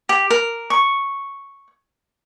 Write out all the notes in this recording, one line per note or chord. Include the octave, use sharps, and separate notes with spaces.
G4
A#4
C#6